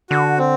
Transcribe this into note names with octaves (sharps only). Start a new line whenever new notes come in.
D3 F#4
C4